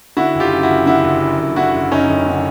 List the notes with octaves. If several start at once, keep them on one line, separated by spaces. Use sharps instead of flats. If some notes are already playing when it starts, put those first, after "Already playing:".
D3 E4 F#4
F#1
F4 G4
F#2
E4 F#4
F#1
D3 E4 F#4
F#1
F#2
F#1
D3 E4 F#4
F#1
F#2 C#4 D#4
F#1
D3